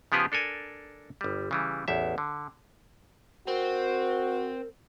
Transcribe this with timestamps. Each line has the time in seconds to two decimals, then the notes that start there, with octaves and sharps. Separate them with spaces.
0.12 C#3 F3 B3 G4 G#4
0.32 D4 A4 A#4 G#5
1.21 G1 G3
1.51 C#3 E3 G3
1.88 A1 E2 E5
2.18 D3
3.47 C4 F#4 A#4